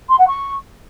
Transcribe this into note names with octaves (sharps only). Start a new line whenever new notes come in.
C6
F#5
C#6